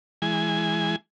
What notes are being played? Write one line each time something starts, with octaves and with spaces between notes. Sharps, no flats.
E3 G#3 G#5